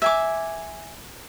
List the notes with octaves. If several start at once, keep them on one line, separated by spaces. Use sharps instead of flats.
E5 G#5 D6